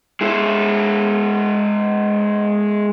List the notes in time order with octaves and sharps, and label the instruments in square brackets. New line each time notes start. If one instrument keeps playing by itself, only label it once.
[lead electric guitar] G#3 E4